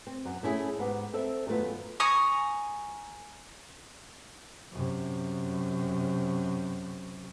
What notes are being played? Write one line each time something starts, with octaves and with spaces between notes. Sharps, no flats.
C4
F#2
A3 C#4 E4 G4 G#4
G#2 B3 G4
C4 A4 E5
F#2 D#3 A3 B3 F4
G#5 A#5 C#6 D#6
F#2 C3